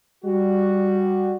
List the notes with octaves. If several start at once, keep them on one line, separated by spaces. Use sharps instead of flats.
G3 F#4